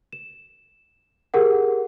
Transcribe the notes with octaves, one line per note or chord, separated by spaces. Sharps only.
E7
G4 G#4 A#4 F#5